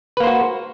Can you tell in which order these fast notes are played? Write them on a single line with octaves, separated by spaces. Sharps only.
B4 A#3 C5 F#4